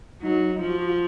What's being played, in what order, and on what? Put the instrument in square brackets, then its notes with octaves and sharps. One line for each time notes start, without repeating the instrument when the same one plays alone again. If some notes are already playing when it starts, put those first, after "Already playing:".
[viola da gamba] F#3 [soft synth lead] D#4
[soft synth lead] D#4
[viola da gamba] F3 [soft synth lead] F4
[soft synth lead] F#4
F#4
F4